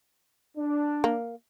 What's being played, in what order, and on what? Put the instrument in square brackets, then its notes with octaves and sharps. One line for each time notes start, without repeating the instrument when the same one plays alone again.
[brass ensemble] D4
[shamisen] A#3